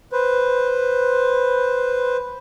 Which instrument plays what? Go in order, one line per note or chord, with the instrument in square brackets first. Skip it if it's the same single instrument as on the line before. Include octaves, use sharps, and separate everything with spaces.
[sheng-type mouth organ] B4 C5